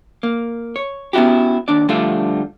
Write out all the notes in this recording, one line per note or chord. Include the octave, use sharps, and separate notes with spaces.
A#3
C#5
B3 C#4 E4 F#4 G4
D#2 D4 D5
D3 F3 G3 A3 D4 F4